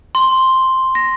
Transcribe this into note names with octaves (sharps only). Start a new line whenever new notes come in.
C6
A#6